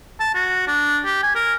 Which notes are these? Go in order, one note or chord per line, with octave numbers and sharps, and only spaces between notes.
A5
F#4
D4
G4
G#5
A#4